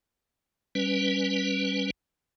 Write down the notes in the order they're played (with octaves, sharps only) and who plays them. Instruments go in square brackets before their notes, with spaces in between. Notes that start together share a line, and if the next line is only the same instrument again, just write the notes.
[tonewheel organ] G3 C#4 B4